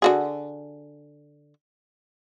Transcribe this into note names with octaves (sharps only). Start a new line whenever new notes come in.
D3 F#4 G#4